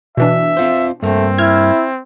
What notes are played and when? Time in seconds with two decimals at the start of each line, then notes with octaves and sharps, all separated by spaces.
0.17 B2 E3 D4 E5
0.57 C4 F4 C5
1.03 G2 A3 A#3 C4
1.38 E4 F6 G#6